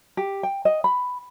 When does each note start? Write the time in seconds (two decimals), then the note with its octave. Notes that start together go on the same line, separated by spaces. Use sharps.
0.17 G4
0.43 G5
0.65 D#5
0.84 B5